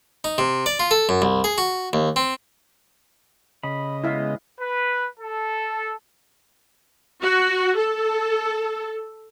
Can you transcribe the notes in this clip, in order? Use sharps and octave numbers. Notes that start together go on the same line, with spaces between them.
D#4
C3
D5
F4
A4
F#2
C2
G#4
F#4
D#2
C4
C#3 D#5 B5
G#3 B3 E4 E5 F5
B4
A4
F#4
A4